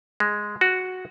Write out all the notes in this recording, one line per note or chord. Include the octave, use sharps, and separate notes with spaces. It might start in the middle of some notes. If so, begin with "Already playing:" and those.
G#3
F#4